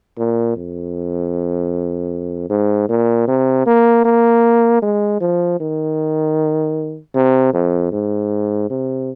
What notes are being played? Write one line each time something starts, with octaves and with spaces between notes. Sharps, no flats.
A#2
F2
G#2
A#2
C3
A#3
A#3
G#3
F3
D#3
C3
F2
G#2
C3